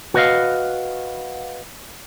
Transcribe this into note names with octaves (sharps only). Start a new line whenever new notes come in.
F#4 B4 D#5 F5